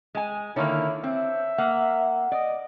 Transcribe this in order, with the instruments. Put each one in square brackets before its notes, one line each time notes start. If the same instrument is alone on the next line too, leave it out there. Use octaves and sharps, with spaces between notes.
[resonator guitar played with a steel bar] G#3 G#5
[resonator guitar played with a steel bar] D3 D#3 A#3 [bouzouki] D4 C#5 [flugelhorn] E4
[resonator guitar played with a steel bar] C4 [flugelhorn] E5
[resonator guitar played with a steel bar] A#3 [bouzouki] F#5
[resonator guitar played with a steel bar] D5 [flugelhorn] D#5